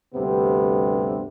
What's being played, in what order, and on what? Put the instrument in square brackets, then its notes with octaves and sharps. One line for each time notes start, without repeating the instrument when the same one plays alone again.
[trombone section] D2 G2 C3 B3